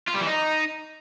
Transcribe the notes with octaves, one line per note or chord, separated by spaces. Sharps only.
F4
G3
E3
D#4